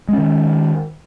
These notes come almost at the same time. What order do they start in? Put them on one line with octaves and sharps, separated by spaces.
G#3 C#4 D#3